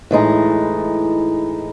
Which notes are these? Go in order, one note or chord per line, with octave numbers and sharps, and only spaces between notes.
A2 E3 G#3 D#4